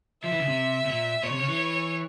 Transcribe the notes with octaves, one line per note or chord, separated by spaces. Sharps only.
F3 E5
E3
C#3
C3
C3
A#2
A#2 C#5
C3
C#3
E3